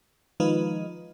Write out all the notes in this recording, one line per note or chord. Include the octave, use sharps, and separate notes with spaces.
D#3 F3 G#3 D#4 F4 B4